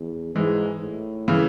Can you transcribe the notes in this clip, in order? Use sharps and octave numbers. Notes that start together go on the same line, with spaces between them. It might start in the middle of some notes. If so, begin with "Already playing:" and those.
Already playing: E2
G#2 E3 G#3
A2
C#3 E3